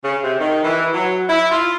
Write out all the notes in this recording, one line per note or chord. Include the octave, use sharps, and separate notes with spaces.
C#3
C3
D#3
E3
F#3
E4
F4